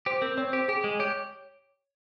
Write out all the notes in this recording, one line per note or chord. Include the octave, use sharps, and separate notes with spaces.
G4 C5
C4 A#4
C4 C#5
G4 C5
G4 G#4
G#3
G4 C#5